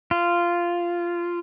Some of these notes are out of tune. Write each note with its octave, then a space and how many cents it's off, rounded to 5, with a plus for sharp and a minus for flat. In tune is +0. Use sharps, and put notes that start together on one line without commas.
F4 -10